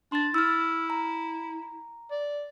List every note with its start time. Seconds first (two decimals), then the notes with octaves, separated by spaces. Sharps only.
0.12 D4 C6 A6
0.34 E4 E6 F6
0.90 A#5
2.11 D5